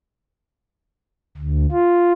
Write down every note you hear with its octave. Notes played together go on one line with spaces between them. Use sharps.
D2
F4